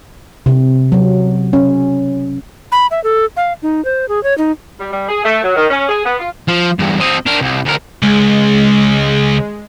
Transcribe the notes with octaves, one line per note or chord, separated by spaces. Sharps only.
C3
F#3
C#4
B5
E5
A4
F5
D#4
C5
G#4
C#5
D#4
G3
G3
G#4
A3
F#3
D#3
C#4
G#4
B3
F4
F3
E2 G2
C4 D#5
D4 A#4
C2
D2 A#4
C#2 G#3